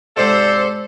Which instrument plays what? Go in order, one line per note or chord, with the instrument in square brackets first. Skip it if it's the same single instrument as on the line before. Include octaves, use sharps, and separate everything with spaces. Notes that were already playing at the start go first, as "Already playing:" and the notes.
[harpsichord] G#2 C3 [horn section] A4 C5 [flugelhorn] D5